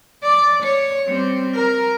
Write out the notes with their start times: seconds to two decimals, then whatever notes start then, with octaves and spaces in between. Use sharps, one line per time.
0.23 D5
0.63 C#5
1.07 G3 C4
1.54 A#4